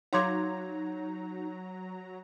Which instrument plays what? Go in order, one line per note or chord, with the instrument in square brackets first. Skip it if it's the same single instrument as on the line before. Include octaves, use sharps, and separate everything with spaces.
[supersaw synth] F#3 A#5 [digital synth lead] D#4 [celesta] C#5 G#6 [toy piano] F5 C6 D6